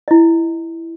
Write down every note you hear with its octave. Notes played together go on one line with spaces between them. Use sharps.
E4 D#5